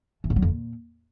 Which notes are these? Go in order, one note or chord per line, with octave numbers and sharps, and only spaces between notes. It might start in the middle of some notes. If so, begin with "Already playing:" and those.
E3
G#2
F#3
F2
A#2